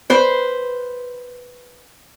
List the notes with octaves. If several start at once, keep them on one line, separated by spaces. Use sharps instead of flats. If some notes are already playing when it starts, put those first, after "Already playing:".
B4 C5